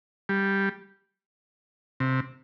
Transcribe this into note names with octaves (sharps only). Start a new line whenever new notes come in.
G3
C3